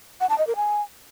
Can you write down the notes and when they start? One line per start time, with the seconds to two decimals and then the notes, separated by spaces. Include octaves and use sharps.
0.20 F#5
0.29 A5
0.38 D#5
0.47 A#4
0.56 G#5